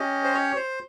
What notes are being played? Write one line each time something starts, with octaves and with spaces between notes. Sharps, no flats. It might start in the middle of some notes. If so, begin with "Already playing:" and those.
Already playing: C#4 G4 D#5
C5
C#5
C5